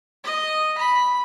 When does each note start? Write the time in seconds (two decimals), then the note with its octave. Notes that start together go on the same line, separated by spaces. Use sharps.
0.24 D#5
0.78 B5